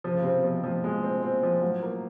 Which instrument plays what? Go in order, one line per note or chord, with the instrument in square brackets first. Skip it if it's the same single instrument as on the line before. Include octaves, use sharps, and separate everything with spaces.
[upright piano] C3 [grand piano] F3
[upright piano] C#3
[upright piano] C3 [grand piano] C4
[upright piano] B2 [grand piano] F3
[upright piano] A2 [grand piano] F3
[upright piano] A#2
[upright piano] B2 [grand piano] G#3
[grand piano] C4
[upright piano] A#2 [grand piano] C4
[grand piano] F3
[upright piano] A2 [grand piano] F#3
[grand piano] A#3